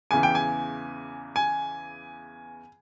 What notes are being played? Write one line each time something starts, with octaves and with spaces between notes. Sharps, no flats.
E2 C#3 E3 G#5
G5
G#5
G#5